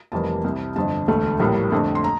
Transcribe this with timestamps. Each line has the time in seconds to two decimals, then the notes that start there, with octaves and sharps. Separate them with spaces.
0.12 F1 F2 E3 G3 A#3 A5
0.44 C2 C3 G3
0.76 G1 F2 D3 A5
1.08 E1 D2 D3 A3
1.39 A#1 A2 G3 A#3
1.72 F2 D3 A3
1.95 C6
2.04 A#5